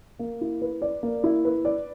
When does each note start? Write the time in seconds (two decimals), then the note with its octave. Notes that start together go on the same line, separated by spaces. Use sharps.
0.19 A#3
0.41 E4
0.62 B4
0.82 D5
1.03 A#3
1.24 E4
1.45 B4
1.65 D5